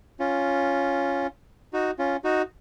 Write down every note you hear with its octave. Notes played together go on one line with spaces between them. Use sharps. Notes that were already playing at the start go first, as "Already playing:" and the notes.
C#4 F4
D#4 F#4
C#4 F4
D#4 F#4